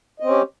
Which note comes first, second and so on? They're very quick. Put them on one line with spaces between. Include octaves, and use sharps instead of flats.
D#5 C4 C#4 G4